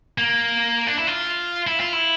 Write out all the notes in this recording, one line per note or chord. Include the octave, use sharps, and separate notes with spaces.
A#3
D4
E4
F4
E4
F4
E4